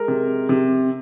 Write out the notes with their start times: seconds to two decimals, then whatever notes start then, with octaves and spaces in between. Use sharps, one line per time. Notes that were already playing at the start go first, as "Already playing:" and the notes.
Already playing: G#3 A#4
0.08 C3
0.49 C3